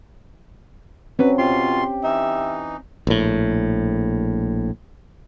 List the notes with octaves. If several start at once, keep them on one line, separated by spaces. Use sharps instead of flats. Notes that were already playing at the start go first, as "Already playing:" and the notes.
F#3 C4 C#4 B4
B2 F4 G4 C6
E3 D#4 E5
A#1 A2